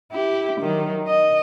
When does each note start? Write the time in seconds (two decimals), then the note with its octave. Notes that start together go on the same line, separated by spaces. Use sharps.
0.12 E4 G4
0.60 D#3 F#3
1.08 D#5